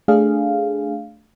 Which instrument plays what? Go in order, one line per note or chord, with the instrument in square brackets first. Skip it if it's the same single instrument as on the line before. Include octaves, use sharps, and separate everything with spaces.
[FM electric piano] A3 D4 G#4 F5